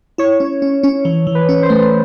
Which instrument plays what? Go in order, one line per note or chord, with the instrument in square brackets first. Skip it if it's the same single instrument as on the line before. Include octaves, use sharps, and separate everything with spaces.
[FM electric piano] E4 [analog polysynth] C#5
[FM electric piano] C#4
C#4
C#4
E3
E3
[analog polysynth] B4
[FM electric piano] C#4
[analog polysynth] C5
[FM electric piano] A3